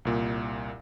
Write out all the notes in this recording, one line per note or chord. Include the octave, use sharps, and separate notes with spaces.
C2 A#2